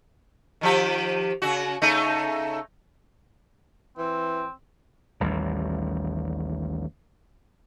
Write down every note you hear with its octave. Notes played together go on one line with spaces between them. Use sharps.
D#3 F3 G4
C#3 F#4
C#3 A3 D#4
E3 C4
A1 D#2 G3